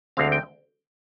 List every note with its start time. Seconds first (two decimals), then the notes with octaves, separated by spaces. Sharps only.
0.17 D2 D3 G#3 C4 F5
0.32 G5